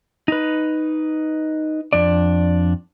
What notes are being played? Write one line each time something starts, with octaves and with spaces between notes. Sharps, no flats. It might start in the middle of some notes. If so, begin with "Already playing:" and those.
D#4 B4
F2 D4 D5